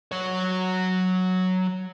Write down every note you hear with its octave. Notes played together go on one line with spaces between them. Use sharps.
F#3 C#5